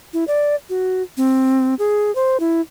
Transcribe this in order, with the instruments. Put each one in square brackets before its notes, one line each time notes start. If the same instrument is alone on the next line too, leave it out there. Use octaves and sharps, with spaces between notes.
[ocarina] E4
D5
F#4
C4
G#4
C5
E4